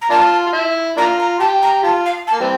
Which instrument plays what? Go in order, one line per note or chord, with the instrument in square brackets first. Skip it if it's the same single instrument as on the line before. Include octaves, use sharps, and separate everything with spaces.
[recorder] A#5
[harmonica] A#3 D4 F4 [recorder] A5
[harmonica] F4
E4
[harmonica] A#3 D4 F4 [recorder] A#5
[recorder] A#5
[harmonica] G4 [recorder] A5
[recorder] A#5
[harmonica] F4 [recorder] A5
[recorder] F5
A5
[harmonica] A#3
E3 G3 C4